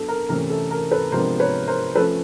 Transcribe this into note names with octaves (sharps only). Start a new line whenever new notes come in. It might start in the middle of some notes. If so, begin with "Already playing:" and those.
Already playing: F#3 B3 D4 A4
A#4
C3 E3 A3 C#4 E4 A#4
A4
A#4
A4 B4
C3 F3 G#3 B3 D4 A#4 C5
B4 C#5
A#4 C5
F3 A3 C#4 A4 B4